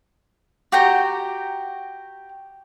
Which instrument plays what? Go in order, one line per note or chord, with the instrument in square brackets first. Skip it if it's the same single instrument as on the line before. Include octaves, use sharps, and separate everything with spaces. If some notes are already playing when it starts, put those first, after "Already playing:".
[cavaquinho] F#4 G4 G5 A#5